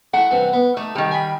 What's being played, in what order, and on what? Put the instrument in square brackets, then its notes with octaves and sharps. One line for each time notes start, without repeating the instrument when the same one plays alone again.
[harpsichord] A3 E4 [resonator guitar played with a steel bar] F#5
[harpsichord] G2 C3 E3
B3
[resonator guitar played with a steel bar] A3 [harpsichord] D#4
[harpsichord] C2 [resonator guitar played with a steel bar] D#3 G3
[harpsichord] G#5 B5